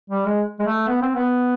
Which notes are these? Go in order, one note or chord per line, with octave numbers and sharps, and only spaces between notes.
G3
G#3
G#3
A3
B3
C4
B3